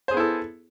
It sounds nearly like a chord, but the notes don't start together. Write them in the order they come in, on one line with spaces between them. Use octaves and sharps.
C5 G#4 B3 E4 A4